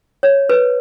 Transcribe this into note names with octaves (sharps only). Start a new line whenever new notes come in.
C#5
B4